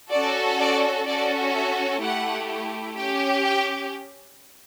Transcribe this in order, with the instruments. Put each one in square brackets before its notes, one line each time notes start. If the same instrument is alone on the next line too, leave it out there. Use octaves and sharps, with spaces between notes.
[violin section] C#4 F#4 A4 D5
D5
C#4 F#4 A4 D5
E5
A3 E4 G4 F#5
C#4 G4 G5
G5